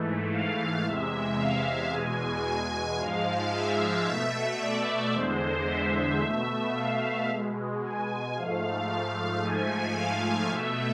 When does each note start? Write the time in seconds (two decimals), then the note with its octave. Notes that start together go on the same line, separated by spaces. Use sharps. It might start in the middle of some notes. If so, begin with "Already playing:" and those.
Already playing: G#2 E3 A3
0.31 F5
0.85 E2 C3 G#3 E5
1.38 F5
1.92 E2 B2 G#3 G#5
2.45 G#5
2.99 G#2 F3 G#3 F5
3.54 E5
4.07 B2 A3 E5
4.60 D5
5.13 E2 D3 G#3 C5
5.68 E5
6.21 B2 A3 E5
6.75 F5
7.28 B2 G#3
7.82 G#5
8.35 G#2 F3 A3 F5
8.90 F5
9.43 G#2 F3 A3 G#5
9.98 F5
10.50 B2 A3 E5